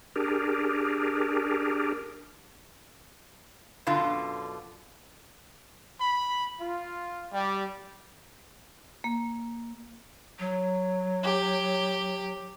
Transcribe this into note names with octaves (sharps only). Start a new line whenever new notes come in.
D4 G4 G#4 A#4
F#2 B2 D3 F4
B5
F4
G3
A#3
F#3
G4